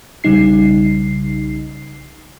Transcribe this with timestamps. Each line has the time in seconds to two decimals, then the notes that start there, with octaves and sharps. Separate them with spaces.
0.24 B1 C#3 G3 D#4 C7